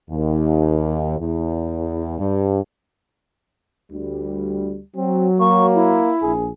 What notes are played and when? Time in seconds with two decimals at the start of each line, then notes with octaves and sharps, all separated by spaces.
0.10 D#2
1.18 E2
2.18 G2
3.91 D2 G3
4.96 F#3 C4
5.40 A#3 C#6
5.75 E4
6.22 A#1 G#4